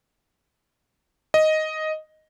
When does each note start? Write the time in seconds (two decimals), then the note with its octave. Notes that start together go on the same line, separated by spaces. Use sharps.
1.34 D#5